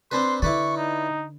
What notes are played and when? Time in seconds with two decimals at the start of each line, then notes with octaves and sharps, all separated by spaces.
0.11 C4 D4 B4 C6
0.42 D3 E4 B4 D5 C#6
0.77 D#4